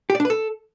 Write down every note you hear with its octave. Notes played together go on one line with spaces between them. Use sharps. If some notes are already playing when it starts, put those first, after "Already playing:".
G4
D5
D4
B4
A4